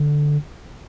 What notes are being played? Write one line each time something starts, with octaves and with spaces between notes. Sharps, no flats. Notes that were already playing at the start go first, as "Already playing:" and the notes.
Already playing: D3